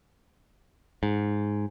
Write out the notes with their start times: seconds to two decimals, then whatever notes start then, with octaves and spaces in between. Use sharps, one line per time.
1.03 G#2